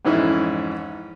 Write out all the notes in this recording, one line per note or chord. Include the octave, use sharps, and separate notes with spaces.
F2 G#2 E3 C#4 E4